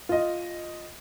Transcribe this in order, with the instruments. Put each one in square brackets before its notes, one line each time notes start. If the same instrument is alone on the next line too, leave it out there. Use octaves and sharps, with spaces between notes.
[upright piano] F4 D#5